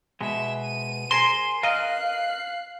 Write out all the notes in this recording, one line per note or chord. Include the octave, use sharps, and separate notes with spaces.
B2 G#3 E5 E6
D#7
G#4 A#4 C5 C6
A#4 D#5 F5 F#6 C7